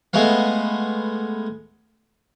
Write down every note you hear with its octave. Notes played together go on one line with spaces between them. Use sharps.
G#3 A3 B3 F5